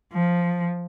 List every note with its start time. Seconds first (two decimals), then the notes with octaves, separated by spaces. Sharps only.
0.13 F3